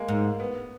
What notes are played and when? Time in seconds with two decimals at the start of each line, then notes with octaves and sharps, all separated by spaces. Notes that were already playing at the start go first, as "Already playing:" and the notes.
Already playing: G#3 A#3
0.08 G#2
0.40 B3